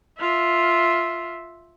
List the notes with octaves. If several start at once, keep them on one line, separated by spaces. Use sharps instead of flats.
F4 E5